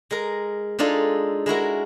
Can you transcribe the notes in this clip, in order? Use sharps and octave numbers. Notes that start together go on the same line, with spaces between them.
G#3 A#4
G#3 D4 D#4 F4 A4
G#3 E4 F#4 A#4